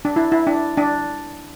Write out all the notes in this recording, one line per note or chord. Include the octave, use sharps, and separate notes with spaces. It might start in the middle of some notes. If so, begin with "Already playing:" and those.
D4
E4
E4
D4
D4